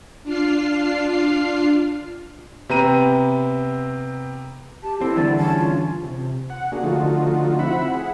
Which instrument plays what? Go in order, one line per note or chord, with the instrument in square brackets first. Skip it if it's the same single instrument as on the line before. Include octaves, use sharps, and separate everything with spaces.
[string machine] D4 F4 F5 C7
[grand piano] C3 B3 C4 A#5 D#7
[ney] G4 [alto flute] A5
[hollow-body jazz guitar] C4 [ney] E4 [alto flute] A4
[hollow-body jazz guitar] E2 G2 D3 [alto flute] D5
[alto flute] C#4 [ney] A5
[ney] F4
[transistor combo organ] C3
F#5
A#3 D4 F#4 G#4
D3 F3 A3 D#4 F4 F#4
C4 E4 E5 F#5 B5
G#4 F#5